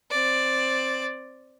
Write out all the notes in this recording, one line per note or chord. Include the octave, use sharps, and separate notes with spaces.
C4 D5